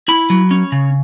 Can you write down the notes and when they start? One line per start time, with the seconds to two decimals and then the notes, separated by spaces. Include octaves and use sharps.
0.08 E4 B5
0.30 F#3
0.51 C#4
0.72 C#3